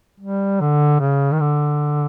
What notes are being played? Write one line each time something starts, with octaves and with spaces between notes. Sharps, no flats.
G3
D3
C#3
D#3
D3